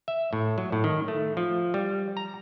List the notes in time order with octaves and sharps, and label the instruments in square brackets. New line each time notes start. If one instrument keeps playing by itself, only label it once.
[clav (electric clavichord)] E5
A2
F#3
A2
D#3
A3
F3
G3
A#5